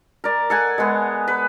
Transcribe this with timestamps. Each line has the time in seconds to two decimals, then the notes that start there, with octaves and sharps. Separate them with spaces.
0.24 A#4 D5
0.50 A4 F#5 G#5
0.78 G#3 B3
1.28 B4